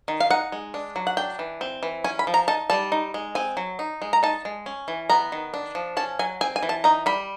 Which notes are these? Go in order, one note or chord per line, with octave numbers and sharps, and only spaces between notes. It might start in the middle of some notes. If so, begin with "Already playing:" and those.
D#3
F5
D#4 F#5
G#3
D4
F#3
F#5
D4 G5
E3
C4
E3
C#4 G#5
B5
F3
A#5
D#4 A5
G3 A5
D#4
G#3
C4 G#5
F#3
D#4
G#3
A#5
D#4 A5
G#3
C#4
E3
B3 A#5
D#3
D4
F3
C#4 A5
F#3 G#5
C4 G#5
G#5
E3
A5
D#4 A#5
G3 B5